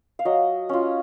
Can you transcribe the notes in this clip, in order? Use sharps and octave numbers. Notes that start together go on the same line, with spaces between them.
F5
F#3 D#5
C#4 F4